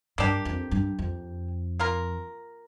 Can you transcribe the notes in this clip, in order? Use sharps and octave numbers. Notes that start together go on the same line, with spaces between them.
G2 A#3 D4 G4
F2
G2
F2
A#3 F4 A#4